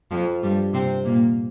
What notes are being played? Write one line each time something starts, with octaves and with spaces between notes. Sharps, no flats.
F2 F3
G2 G3
C3 C4
A#2 A#3